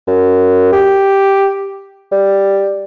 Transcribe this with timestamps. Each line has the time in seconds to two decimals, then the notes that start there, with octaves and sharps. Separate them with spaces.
0.08 F#2
0.73 G4
2.12 G3